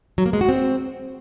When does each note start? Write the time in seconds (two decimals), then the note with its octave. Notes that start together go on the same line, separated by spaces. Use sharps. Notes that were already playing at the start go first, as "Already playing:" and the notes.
0.18 F#3
0.26 A#3
0.33 G#3
0.41 F#4
0.49 C4